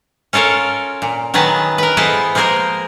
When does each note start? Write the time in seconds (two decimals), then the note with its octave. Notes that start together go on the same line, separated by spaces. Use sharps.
0.33 C#4 F4 A4 A#4 C#5
1.02 A#2
1.34 D#3 F#3 B3 G#4 B4 A5
1.78 A#4 B4
1.97 B3 E4 G#4 A4 C5 D#5
2.35 F3 G#3 A#3 G#4 A#4 C5